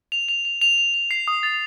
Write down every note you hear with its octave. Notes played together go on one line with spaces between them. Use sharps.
F7
F7
F7
F7
F7
F7
C7
D#6
A6